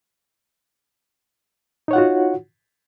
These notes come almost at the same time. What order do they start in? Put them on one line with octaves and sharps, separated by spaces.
D#4 C#5 F#5 F4 F#4